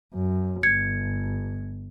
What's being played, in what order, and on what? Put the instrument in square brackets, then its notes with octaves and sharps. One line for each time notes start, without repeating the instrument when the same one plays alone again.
[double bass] F#2
[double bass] G1 [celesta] G#6 C#7